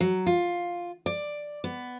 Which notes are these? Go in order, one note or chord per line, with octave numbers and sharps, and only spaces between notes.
F#3
F4
D5
B3